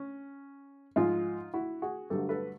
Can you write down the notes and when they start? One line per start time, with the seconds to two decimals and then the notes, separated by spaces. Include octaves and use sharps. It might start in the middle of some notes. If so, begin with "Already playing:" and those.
Already playing: C#4
0.96 G#2 F3 G#3 D#4 F4
1.54 E4 F#4
1.82 F#4 G#4
2.10 G2 D3 F#3 A3 G4 A4
2.29 A4 B4